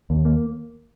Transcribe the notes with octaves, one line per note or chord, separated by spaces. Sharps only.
D#2
A#3